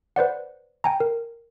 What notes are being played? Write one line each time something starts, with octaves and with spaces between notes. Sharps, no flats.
B4 C5 D5 F#5
G5 G#5 A#5
A#4